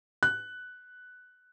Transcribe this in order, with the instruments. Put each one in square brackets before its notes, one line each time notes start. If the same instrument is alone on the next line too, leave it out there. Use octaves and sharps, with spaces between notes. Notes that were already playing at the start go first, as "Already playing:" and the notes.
[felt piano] F#6